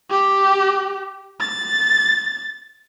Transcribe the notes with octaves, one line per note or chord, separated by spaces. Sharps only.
G4
A6